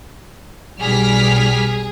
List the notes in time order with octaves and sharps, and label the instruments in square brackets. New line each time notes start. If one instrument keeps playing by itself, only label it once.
[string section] B1 F6 B6 [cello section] G3 [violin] G#4